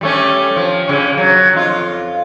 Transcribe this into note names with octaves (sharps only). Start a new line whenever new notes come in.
G3 A3 C#4
F3
C#3 C#4
F#3
F2 F4